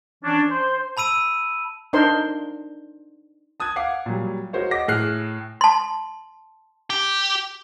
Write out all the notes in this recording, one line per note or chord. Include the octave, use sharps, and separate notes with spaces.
E3 C#4 D4
C5
A5 B5 E6 D#7
D4 D#4 A#4 C5 C6
A5 D#6 F#6 G#6
F5 F#5 D6 C7
A#2 F#3 G3
G#3 F#4 A#4 C5 C#5
D#5 F#5 D6 A#6
A2 G#4 F6 F#6 C7
A5 C6
G4